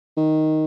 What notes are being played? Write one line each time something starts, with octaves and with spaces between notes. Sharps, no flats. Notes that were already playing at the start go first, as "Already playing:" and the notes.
D#3